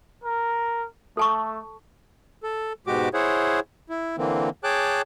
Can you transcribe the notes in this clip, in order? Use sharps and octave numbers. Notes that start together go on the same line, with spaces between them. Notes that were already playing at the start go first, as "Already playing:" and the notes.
A#4
A3 A4 A5 C#6
A4
G#2 B2 G#3 F#4 G4 D6
E4 G#4 C5 C#5 F#5
E4
D3 E3 A#3 C4
G#4 C#5 G5 A5 D6 F#6